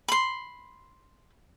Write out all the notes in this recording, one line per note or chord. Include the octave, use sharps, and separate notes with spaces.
B5 C6